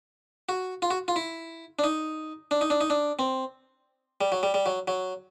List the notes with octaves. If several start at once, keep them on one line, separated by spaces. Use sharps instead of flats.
F#4
F4
F#4
F4
E4
D4
D#4
D4
D#4
D4
D#4
D4
C4
G3
F#3
G3
G3
F#3
F#3